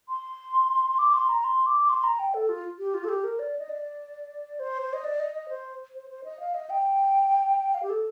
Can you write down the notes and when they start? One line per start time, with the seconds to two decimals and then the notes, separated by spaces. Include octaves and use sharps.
0.09 C6
0.99 D6
1.13 C6
1.29 A#5
1.44 C6
1.66 D6
1.89 C6
2.04 A#5
2.19 G5
2.34 A4
2.49 F4
2.79 G4
2.94 F4
3.04 A4
3.09 G4
3.24 A#4
3.39 D5
3.59 D#5
3.69 D5
4.59 C5
4.82 C5
4.93 D#5
5.04 D5
5.20 D#5
5.35 D#5
5.49 C5
5.94 C5
6.10 C5
6.24 D#5
6.40 F5
6.54 D#5
6.70 G5
7.74 F5
7.83 G4
7.90 A4